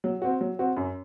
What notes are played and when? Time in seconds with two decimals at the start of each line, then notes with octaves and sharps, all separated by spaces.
0.04 F#3
0.22 C4 F#4
0.41 F#3
0.59 C4 F#4
0.77 F#2